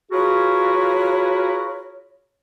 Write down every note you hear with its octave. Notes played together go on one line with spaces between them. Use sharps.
F4 F#4 G#4 A#4 B4 C#5